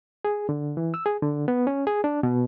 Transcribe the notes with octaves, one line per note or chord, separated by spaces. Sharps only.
G#4
D3
E3
E6
G#4
D3
B3
C#4
G#4
D4
B2